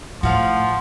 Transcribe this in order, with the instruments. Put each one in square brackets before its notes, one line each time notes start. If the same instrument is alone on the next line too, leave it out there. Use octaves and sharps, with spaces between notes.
[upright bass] A2 [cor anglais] F3 [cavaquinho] F#4 F5